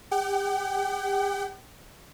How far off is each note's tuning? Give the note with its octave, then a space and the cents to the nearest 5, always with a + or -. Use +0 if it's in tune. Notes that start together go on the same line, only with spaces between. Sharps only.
G4 +40 G5 -45